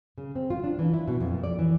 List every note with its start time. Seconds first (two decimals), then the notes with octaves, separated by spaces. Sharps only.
0.18 C#3
0.35 C4
0.50 F4
0.64 D4
0.79 E3
0.93 E4
1.08 B2
1.20 F2
1.32 A#2
1.44 D5
1.59 E3